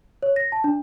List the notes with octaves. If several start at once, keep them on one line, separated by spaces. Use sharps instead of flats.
C#5
A#6
A5
D4